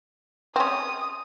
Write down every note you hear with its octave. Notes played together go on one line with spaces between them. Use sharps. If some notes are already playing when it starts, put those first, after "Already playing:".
C4 C#4 D#6